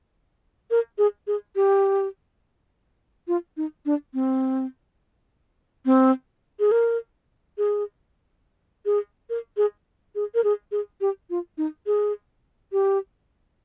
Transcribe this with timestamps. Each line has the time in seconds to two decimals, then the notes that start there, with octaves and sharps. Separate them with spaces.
0.71 A#4
0.98 G#4
1.27 G#4
1.56 G4
3.28 F4
3.57 D#4
3.86 D4
4.14 C4
5.85 C4
6.60 G#4
6.72 A#4
7.58 G#4
8.86 G#4
9.30 A#4
9.57 G#4
10.15 G#4
10.35 A#4
10.44 G#4
10.72 G#4
11.01 G4
11.30 F4
11.58 D#4
11.87 G#4
12.72 G4